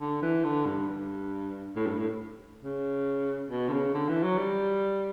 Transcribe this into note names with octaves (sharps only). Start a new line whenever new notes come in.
D3
E3
D3
G2
G2
A2
G2
A2
C#3
B2
D3
C#3
D3
E3
F#3
G3